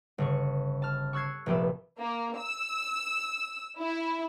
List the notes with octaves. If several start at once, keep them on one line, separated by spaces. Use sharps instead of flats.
G1 C#3 C#6
A5 F6
C#6 E6 F#6 G#6 C7
F1 A#1 F3 G4 B4 E5
A#3
E6
E4